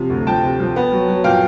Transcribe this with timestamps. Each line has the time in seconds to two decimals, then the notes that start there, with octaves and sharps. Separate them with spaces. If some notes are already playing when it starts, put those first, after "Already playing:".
Already playing: C3 F3
0.10 D2
0.27 F3 G5 A5
0.43 C3
0.60 F3
0.76 B3
0.92 F#3
1.08 F#3
1.24 A#2 F5 G5